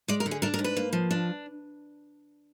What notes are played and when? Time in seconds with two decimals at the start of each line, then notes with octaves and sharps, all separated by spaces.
0.08 G#3 D5
0.20 A#4
0.26 D3
0.31 G#4
0.42 D4 A#4
0.54 A#4
0.59 G#2
0.64 B4
0.77 A#3
0.93 F3
1.11 D4